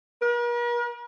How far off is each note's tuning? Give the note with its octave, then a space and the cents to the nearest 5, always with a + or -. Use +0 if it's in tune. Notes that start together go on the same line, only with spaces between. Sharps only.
A#4 +45